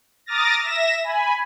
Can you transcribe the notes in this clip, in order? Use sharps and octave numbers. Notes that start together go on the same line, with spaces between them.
A#5 D6 D#6 F6 A6 A#6
E5 A#6 E7
G#5 B5